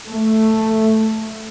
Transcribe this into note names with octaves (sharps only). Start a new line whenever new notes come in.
A3